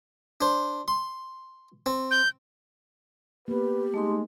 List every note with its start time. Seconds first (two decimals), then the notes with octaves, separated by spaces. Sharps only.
0.41 D4 C5
0.88 C6
1.86 C4
2.11 G6
3.48 A#3 B3 G4 B4
3.94 G#3 A3 D#4 C6